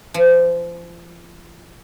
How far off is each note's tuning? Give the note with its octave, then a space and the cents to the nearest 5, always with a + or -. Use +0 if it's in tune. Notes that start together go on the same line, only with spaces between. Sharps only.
F3 -30